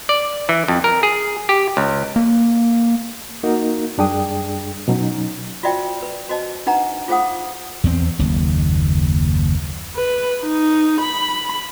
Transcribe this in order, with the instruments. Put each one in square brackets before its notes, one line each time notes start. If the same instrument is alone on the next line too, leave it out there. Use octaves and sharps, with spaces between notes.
[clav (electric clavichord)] D5
E3
F2
A#4
G#4
G4
C#2
[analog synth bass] A#3
[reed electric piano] A#3 D#4 F#4 A#4
F#2 G3 D4 G#4 G5 D#6
B2 F#3 C#4 D#4
[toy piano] F4 F#4 C5 D5 E5 G5
B4
F#4 C5 D#5 A5
D4 D#4 B4 F#5 A#5
F4 G#4 C5 F5 F#5 D#6
[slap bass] E2 C4
F#1 D#2
[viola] B4
D#4
B5